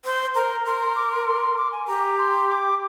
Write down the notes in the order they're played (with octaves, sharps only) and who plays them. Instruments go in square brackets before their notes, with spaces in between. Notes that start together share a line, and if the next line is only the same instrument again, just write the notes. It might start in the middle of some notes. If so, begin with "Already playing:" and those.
[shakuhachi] C5
[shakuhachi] A#4 [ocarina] A#5
[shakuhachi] A#4 [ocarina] C6
[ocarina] C6
D6
C6
A#5
C6
C6
D6
G#5
[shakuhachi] G4 [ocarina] A#5
[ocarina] C6
D6